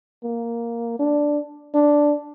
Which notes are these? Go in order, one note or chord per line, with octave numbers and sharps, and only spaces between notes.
A#3
D4
D4